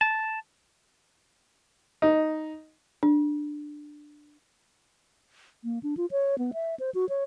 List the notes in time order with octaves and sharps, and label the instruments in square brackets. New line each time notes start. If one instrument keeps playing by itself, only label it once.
[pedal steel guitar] A5
[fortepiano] D#4
[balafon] D4
[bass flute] A#3
D4
F4
C#5
B3
E5
C5
F#4
C#5